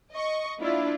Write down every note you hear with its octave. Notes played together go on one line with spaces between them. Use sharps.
D#5 C#6
A#3 D4 E4 F4 D5